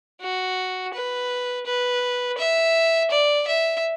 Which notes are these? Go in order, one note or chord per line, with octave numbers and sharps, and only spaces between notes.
F#4
B4
B4
E5
D5
E5